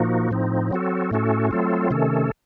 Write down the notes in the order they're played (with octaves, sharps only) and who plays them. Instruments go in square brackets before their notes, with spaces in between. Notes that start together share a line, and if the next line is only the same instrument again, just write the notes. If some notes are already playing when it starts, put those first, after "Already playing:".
Already playing: [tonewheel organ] A#2 F3 A#3 D#4 F#4
A2 F3 C4 D#4
F#3 C4 F#4 A4
A2 A3 C#4 F#4 A4
F#3 A3 C4 F4 A4
C3 D#3 A3 C#4 A4